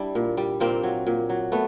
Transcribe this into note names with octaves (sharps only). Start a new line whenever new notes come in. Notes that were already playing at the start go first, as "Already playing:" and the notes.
Already playing: G3 D4 E4
A#2
G3
A#2 A#3 C4
F#3
A#2
F#3
A3 B3